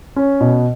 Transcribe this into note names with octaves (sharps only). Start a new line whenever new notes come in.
C#4
B2